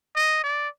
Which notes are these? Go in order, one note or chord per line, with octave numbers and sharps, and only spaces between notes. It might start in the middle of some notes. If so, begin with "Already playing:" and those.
D#5
D5